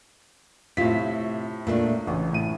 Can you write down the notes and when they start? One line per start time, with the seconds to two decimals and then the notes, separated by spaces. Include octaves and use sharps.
0.77 A2 C3 F4 B6
1.67 A#2 A3 D4
2.07 A1 C#3
2.32 A2 D#7